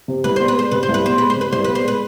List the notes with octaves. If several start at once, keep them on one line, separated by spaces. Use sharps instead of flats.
C3
C2 B4
B3 C5
B4
G#3 C5
C3 B4
C5
C2
B4
B3 C5
G#3 B4
C5
C3
B4
C2 C5
B3 B4
C5
G#3 B4